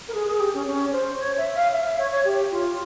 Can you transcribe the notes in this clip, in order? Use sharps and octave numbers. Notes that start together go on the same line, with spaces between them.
A#4
G#4
G#4
G4
C#4
C#4
C5
C#5
E5
F5
E5
E5
C#5
C#5
G4
F4